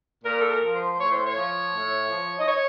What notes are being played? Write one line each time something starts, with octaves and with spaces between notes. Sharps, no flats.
A#2 A#4
A4
A#4
F3
C5
A2 C#5
C5
C#5
F3
A2
F3
D#5
C#5